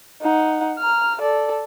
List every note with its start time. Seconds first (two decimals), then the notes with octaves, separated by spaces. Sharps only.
0.22 D#4 F#5
0.79 A#5 F6
1.21 A4 D5